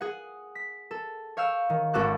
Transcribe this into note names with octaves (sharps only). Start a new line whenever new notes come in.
G#4 F#5
B6
A4
C#5 F5 G5 E6
D#3
G#1 C#4 F#4 A4 D6 F#6